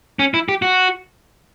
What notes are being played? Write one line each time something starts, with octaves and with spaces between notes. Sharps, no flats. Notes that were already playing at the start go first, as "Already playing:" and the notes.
C#4
E4
G4
F#4